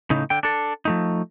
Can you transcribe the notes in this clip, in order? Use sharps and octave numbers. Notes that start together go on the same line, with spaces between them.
A2 C#3 D#4
D3 G5
D4 A4
F3 A3 D#4